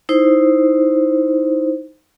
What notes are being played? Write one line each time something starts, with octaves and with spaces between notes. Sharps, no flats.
D#4 E4 C5